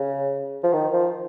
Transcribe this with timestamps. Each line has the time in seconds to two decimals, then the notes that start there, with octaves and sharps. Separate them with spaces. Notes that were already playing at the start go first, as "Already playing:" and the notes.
Already playing: C#3
0.64 F3
0.73 D#3
0.93 F3